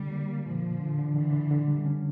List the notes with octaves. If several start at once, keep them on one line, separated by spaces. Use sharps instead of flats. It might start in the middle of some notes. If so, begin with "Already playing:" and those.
Already playing: D3 G3
A#3
A#3
A#2 F3
A#2
D3
D3
D3 E3
D3
D3
G3
C#4